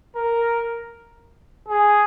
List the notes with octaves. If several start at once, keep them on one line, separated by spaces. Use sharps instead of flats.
A#4
G#4